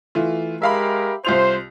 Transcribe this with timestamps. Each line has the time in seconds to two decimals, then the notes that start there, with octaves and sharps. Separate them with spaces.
0.15 E3 A3 F4
0.62 G#3 G4 A#4 E5 F5 B5
1.25 C2 F4 C5 F7